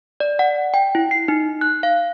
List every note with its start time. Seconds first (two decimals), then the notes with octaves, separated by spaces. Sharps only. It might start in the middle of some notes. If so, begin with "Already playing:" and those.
0.20 D5
0.39 F#5
0.74 G5
0.95 E4
1.11 C7
1.28 D#4
1.61 F#6
1.83 F5